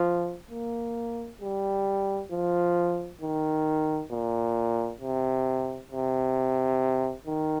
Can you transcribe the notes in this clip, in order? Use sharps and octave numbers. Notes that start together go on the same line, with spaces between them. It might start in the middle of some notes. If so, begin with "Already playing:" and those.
Already playing: F3
A#3
G3
F3
D#3
A#2
C3
C3
D#3